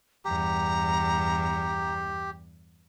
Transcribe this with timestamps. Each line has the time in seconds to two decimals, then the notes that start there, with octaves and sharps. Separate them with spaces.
0.25 E2 G2 G4 A#5